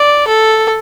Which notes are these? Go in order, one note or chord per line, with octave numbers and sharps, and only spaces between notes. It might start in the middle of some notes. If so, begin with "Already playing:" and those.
Already playing: D5
A4